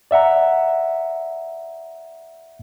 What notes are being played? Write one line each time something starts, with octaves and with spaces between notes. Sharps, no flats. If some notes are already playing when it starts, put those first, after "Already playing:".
D5 E5 F#5 A#5